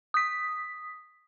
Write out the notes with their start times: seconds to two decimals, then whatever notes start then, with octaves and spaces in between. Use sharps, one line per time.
0.14 D#6 B6